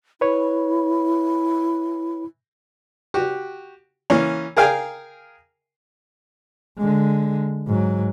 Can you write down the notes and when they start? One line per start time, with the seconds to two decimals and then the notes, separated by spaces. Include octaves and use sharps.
0.21 E4 B4 C#5
3.14 F#4 G4
4.10 E3 A#3 C#4
4.57 G#4 A#4 F5 G5 G#5
6.78 D3 G#3
7.67 G#2 F#3